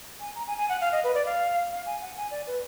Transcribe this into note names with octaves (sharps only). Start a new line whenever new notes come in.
G#5
A#5
G#5
G#5
F#5
F5
D#5
B4
D5
F5
F5
G#5
F#5
G#5
D5
B4